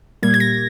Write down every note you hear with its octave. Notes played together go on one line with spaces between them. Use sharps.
A#2 G3 A#3 G#6
G#6
A#6